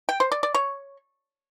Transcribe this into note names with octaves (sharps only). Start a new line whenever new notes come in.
G5
C5
D5
D5
C#5